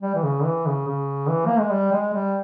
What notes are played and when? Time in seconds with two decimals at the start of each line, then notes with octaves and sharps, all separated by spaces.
0.02 G3
0.15 E3
0.23 C#3
0.44 E3
0.66 C#3
0.87 C#3
1.28 E3
1.46 A#3
1.59 G#3
1.71 G3
1.93 G#3
2.14 G3